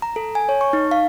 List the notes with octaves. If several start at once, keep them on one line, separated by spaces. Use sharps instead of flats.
A#5
A4
G#5
C#5
C#6
D#4
F5